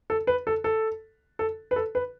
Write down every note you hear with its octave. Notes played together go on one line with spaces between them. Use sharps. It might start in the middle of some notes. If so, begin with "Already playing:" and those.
A4
B4
A4
A4
A4
B4
A4
B4